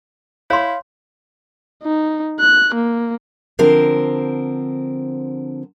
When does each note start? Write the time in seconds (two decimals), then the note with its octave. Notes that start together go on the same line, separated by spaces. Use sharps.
0.50 E4 C#5 F5 C6
1.84 D#4
2.40 F#6
2.75 A#3
3.59 D3 F3 C4 A#4